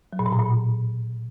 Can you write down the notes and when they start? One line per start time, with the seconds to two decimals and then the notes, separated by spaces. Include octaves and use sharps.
0.13 F#3
0.19 A#2
0.26 B2
0.33 A2
0.39 A#2